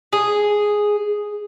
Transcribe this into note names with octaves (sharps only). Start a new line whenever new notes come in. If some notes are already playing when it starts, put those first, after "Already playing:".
G#4